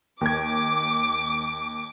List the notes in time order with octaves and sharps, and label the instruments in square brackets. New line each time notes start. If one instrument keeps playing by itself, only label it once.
[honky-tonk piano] D#2 G#6 [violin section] D6